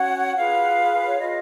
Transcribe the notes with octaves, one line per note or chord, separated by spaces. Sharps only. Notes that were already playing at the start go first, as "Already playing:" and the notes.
Already playing: C#4 F#4 C#5 F#5
F4 G#4 B4 F5
C#5
F4 G#4 B4 D#5